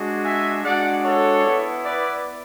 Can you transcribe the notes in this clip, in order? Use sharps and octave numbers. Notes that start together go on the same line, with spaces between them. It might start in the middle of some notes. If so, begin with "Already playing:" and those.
Already playing: G#3 D4 F#4
E5 G#5
G#3 D4 F#4 D5 F#5
A4 C#5
B3 E4
B4 D5